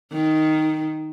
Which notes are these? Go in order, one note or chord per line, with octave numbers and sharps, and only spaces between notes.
D#3